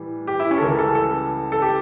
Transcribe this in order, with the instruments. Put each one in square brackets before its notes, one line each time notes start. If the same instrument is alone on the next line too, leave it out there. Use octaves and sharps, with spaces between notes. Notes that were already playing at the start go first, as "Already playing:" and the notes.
Already playing: [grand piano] A2 E3 G3
G4
E4
C#4
A4
C#2 C#3 E3 G3 A#4
A4
A4
A4
G4